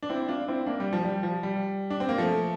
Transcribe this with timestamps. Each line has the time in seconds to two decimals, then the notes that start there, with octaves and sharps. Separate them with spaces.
0.03 D4
0.09 C4 E4
0.29 D4 F4
0.48 C4 E4
0.66 A#3 D4
0.80 G3
0.93 F3
1.05 G3
1.23 F3
1.43 G3
1.90 D4
2.00 C4
2.09 A#3
2.18 F3 A3